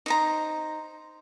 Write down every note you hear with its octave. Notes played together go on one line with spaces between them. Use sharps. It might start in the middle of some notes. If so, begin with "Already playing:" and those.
D#4 C5 A#5